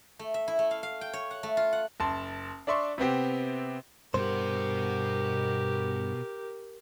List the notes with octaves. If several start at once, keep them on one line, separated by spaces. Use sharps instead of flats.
A3
E5
E4
A3
F5
F5
G5
C#5
F#5
A3
F4
F#5
F#1 A5 C6
D4 D5 E5 C6 C#6
C3 B3 C4 G4
G2 B2 G4 A#4 C5 F#5